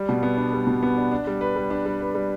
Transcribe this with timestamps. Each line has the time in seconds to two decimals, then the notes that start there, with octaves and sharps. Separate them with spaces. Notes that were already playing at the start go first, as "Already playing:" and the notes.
Already playing: G3
0.09 B2
0.23 B3
0.37 D4
0.53 G3
0.67 B2
0.83 B3
0.96 D4
1.12 D4
1.27 G3
1.41 B4
1.56 G3
1.70 D4
1.86 G3
2.00 B4
2.15 G3